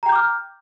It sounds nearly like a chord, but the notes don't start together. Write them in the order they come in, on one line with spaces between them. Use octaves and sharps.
A#5 G5 G6 D6 F6